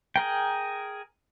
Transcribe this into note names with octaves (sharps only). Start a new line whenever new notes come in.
G#4 A#4 G5